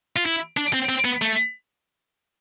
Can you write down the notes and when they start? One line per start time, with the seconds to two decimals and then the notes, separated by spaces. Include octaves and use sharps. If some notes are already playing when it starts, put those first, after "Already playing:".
0.16 F4
0.26 E4
0.57 D4
0.73 C4
0.89 C4
1.05 B3
1.22 A3